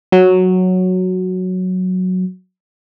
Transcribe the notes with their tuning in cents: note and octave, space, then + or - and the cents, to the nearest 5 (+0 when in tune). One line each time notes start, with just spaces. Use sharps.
F#3 -5